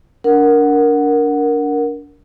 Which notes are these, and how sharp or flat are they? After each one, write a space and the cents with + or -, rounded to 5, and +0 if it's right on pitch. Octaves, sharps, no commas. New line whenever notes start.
D4 -25 A#4 +0 F#5 +0